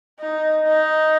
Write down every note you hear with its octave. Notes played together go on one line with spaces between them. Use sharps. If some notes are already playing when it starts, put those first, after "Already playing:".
D#4
D#4